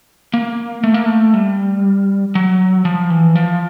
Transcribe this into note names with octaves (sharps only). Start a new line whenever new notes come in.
A#3
A3
A#3
A3
G3
F#3
F3
E3
F3